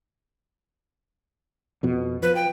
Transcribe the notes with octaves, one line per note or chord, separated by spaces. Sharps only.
F2 B2
F3 B4
G5